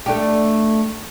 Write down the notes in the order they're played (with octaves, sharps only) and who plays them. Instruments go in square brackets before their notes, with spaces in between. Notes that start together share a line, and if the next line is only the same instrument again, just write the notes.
[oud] A3 D4 G4